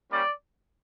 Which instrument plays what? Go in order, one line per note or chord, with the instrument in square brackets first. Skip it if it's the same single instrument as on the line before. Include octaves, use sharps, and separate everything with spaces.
[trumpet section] G3 A#3 C#4 D5